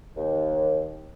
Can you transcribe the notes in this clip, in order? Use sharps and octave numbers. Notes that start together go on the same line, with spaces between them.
D#2